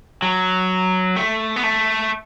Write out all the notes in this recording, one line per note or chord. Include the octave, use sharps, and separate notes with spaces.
F#3
A3
B3
A3